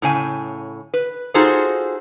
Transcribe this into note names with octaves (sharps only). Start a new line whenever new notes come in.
A2 C#3 G#5
B4
D#4 F4 F#4 G#4 A4 C5